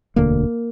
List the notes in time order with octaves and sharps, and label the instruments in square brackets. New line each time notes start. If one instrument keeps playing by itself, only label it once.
[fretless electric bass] E1 D2 D3 A#3